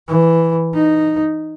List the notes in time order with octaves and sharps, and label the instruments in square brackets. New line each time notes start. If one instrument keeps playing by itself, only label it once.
[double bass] E3
D#4